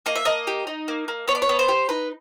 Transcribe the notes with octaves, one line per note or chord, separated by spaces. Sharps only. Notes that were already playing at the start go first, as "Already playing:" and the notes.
A#3 D#5
E5
A#3 D#5
G4
D#4
A#3
A#3
B3 C#5
D5
C#5
B3
C5
G4
D#4 B4